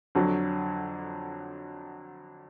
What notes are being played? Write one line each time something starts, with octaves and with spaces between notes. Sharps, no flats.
F2 D3 F#3